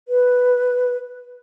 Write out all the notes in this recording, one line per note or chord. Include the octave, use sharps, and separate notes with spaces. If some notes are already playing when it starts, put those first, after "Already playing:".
B4